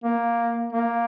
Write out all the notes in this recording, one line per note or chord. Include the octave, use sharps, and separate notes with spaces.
A#3
A#3